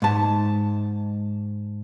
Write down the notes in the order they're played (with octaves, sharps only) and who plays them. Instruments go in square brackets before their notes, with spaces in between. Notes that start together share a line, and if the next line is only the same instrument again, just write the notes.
[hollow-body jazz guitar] G#2 A5